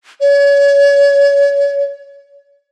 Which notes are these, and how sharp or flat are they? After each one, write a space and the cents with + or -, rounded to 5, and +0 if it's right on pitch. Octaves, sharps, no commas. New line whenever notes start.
C#5 +30